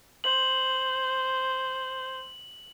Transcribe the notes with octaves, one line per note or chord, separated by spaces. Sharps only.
C5 F#7